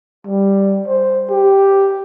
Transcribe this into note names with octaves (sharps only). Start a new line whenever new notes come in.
G3
C5
G4